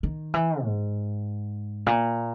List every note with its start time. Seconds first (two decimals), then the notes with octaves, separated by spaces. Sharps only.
0.03 D#3
0.34 E3
0.64 G#2
1.87 A#2